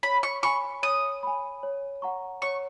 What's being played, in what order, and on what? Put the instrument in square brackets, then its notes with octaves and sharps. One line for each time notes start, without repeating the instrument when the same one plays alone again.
[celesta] C#5 [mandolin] B5
[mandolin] C#6
[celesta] G#5 B5 [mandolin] C#6
[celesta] C#5 [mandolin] D#6
[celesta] G#5 B5
C#5
F#5 A#5 C#6
[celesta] C#5 [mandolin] C#6